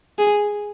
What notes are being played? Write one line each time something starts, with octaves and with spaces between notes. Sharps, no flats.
G#4